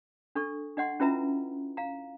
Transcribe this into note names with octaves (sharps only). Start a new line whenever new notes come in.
D4 A4 C#6
D4 D#5 F#5 C6
C#4 E4 F4 B4 E5 A#5
F5 A#5